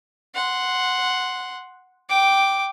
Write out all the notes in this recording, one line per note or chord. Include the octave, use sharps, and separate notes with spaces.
F#5 C6
G5 D6